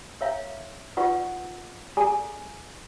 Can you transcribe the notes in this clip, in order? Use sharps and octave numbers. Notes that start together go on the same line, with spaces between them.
A#4 C#5 E5 F5 A#5
D#4 F4 B4 D5 F#5 C#6
G#4 A4 D5 G#5 A#5